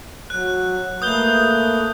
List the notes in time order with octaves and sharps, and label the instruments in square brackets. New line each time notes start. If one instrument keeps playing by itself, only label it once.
[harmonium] F#3 [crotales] F#6
[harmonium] A3 A#3 B4 [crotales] D#6 G6 G7